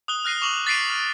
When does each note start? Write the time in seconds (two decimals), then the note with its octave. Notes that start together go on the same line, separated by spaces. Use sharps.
0.08 D#6 F#6 G7
0.24 F6 F#6 A#6 C7 D#7
0.42 C#6 D6 F7 F#7
0.67 A6 B6 C7 D7 D#7
0.89 F6